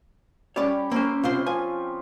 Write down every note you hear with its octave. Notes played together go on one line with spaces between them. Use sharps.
G3 C#4 G4 C#5 D5
A#3 C4 C#4 C5
C2 C4 F4 C5
F3 G#5